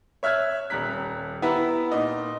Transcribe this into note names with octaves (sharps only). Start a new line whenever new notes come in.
C#5 E5 F6 F#6 G#6
D#1 G3 A#5 F#6 B6
B3 E4 G4 B4 E5 A#5
A#2 D#4 D#5